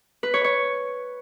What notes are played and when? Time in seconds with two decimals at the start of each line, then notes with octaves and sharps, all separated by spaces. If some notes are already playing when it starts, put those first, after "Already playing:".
0.23 B4
0.34 C#5
0.44 C#5